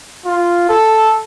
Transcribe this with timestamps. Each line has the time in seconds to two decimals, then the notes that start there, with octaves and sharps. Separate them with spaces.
0.25 F4
0.69 A4